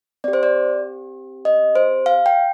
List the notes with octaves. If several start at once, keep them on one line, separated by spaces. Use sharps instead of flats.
C4 G4 D5
C5
D5
D#5
C5
F5
G5